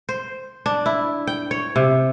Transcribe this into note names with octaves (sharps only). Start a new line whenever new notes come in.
C5
D4
E4
G5
C#5
C3